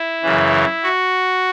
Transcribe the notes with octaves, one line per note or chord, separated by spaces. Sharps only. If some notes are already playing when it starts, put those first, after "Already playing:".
Already playing: E4
F#2 C#3 E3
F#4